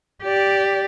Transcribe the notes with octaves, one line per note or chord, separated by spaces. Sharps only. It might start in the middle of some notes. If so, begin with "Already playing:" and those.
G4 D5